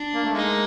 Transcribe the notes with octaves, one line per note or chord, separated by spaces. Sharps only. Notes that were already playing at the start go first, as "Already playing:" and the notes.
Already playing: D4
A#3
A3
G#3 A#3 D#4